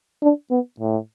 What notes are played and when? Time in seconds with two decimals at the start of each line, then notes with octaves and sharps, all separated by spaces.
0.23 D4
0.51 B3
0.80 A2